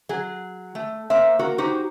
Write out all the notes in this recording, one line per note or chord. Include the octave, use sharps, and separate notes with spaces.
F#3 G#4
A3
A#3 C5 E5
A#3 F#4 A#4
D#4 F#4 G4 C5